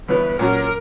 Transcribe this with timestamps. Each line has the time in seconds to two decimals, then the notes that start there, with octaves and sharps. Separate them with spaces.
0.09 G1 G2 E3 B3 B4
0.39 A#2 F#3 C#4 F#4 A#4